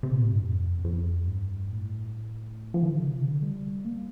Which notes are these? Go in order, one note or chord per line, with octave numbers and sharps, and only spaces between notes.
C3
A#2
A2
G2
F2
F2
G2
A2
F3
D#3
D3
C3
D3
G3
A#3